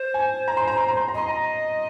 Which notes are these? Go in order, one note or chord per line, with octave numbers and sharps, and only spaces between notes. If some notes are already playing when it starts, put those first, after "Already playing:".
Already playing: C5
G#5
A#5
C6
A#5
C6
A#5
C6
A#5
D#5 C6
A#5